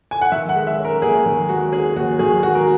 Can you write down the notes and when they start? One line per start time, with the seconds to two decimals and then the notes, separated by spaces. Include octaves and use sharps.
0.11 G#5
0.21 F#5
0.32 D#3 E5
0.49 F#5
0.55 G#3
0.67 E5
0.79 C#4
0.85 A#4
1.02 D#2 G#4
1.26 D#3
1.49 G#3 F#4
1.72 C#4 G#4
1.96 D#2 F#4
2.19 D#3 G#4
2.43 G#3 F#4
2.55 A#4